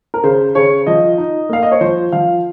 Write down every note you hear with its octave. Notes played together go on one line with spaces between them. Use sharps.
A#4
C#3 C5
C#3 C#5
F3 D#5
D#4
A#3 F5
D#5
C#5
F3 C5
F3 F5